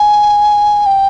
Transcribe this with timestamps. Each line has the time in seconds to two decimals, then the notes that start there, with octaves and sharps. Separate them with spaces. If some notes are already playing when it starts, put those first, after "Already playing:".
Already playing: G#5
0.86 G5